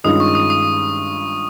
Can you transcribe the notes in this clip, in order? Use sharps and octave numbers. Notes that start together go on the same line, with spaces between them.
G2 D#3 G#3 C#4 F4 D#6
C#6
D#6
D#6